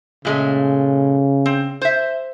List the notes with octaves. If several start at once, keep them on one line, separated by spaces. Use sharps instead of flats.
A#2 C#3 G#3 A3
C4
C5 E5